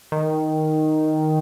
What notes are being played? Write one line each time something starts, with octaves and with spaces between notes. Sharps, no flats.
D#3